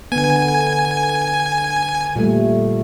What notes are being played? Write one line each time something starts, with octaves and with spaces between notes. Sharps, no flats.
D3 B3 G#5
A#2 G3 A3